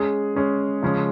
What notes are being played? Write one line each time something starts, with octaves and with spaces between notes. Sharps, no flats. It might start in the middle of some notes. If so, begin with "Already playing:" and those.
Already playing: G#3 C#4 G#4
G#3 C#4 G#4
C#3 F3 G#3 C#4